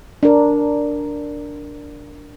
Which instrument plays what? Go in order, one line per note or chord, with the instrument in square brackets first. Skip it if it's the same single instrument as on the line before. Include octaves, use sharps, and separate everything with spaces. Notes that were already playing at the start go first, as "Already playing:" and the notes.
[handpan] D4 A#4